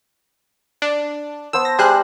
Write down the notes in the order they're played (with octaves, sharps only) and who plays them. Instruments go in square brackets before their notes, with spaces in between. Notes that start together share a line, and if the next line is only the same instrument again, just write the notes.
[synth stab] D4
[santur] B3 C5 A5 [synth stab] E6
[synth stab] A#6
[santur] G3 [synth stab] G#4 C5 F#6